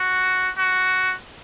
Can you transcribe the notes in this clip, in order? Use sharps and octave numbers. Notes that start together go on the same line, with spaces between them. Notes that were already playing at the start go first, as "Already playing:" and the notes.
Already playing: F#4
F#4